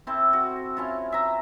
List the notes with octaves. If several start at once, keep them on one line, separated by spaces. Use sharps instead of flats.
C4 E4 A4
F#4
C#4 E4 F4
E5 A#5